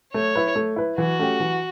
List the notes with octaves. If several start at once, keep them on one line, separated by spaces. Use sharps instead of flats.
A3 C#5
E4 B4
A3
E4 B4
E3 F#4
A3 C#4 G4 C#5
E3